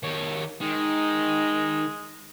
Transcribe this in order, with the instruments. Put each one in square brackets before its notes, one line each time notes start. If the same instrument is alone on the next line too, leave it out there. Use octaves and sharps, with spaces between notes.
[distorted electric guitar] D#3 C#5
[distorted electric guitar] D#3 [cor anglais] G#3